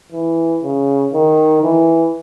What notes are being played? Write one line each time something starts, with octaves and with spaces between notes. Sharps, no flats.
E3
C#3
D#3
E3